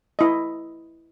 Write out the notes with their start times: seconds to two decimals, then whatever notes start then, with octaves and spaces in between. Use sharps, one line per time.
0.19 E4 D#5